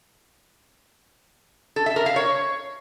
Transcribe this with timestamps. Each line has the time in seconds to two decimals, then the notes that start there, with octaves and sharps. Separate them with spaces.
1.76 A4
1.86 E5
1.96 A#4
2.06 F5
2.16 C#5